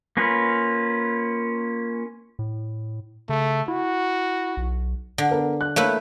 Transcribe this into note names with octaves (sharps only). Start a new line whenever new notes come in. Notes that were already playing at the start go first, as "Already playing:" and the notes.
A#3 C#4 F4 B4
A2
C#3 A3
E4 F#4
B1
D3
B3 A#4 B4
F#6
A3 A#3 E4 B4 C#5 F5